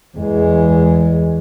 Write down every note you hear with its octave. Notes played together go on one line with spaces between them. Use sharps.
E2 G#3